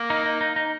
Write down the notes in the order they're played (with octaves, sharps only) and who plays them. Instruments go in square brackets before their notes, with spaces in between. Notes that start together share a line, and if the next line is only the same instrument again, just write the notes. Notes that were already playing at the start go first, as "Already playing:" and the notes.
Already playing: [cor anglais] A#3
[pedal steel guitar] D#4
D#4
D#4
D#4